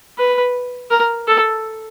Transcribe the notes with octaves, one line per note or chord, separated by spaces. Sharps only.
B4
A#4
A4